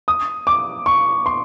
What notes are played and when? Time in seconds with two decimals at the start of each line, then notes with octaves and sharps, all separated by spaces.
0.08 D#6
0.47 D6
0.86 C#6
1.26 C6